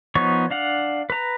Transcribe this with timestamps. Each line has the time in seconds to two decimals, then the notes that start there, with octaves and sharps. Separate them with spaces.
0.15 F3 B3 D#4 C#5 C#6
0.51 D4 F5 F#5
1.10 B4 A#5